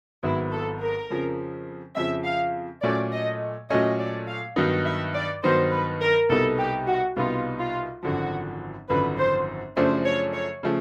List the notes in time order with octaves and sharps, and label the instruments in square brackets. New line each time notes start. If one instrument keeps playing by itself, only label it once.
[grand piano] G#1 G#2 D#3 F#3 B3 [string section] E4
[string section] A4
A#4
[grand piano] F2 C#3 F3
[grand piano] F2 C#3 F3 [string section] E5
[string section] F5
[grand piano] A#2 F#3 A3 C#4 [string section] D5
[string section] D#5
[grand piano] A#2 F#3 A3 C#4 [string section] D#5
[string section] D5
F5
[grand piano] G2 D#3 F#3 B3 D#4
[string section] E5
D5
[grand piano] G2 D#3 F#3 B3 D#4 [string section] C5
[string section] B4
A#4
[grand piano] C2 B2 G3 B3 D#4 [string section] A4
[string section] G4
F#4
[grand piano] C2 B2 G3 B3 D#4 [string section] F4
[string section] F4
[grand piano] G#1 F#2 D3 F3 [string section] F#4
[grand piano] G#1 F#2 D3 F3 [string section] B4
[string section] C5
[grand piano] F#2 C#3 F3 A3 D4 [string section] C5
[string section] C#5
C#5
[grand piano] C#3 F3 A3